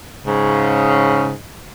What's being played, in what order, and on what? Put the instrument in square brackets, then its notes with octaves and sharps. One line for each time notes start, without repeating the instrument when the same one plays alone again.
[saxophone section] G#2 C#3